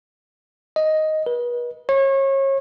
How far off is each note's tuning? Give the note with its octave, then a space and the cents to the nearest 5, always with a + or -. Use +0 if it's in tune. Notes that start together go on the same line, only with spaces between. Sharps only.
D#5 +5
B4 -35
C#5 -30